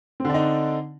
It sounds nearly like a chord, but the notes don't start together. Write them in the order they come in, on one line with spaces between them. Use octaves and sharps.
C4 D3 D4 D#4